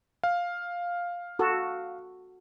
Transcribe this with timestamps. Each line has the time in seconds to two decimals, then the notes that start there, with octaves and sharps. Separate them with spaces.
0.24 F5
1.39 F#4 A4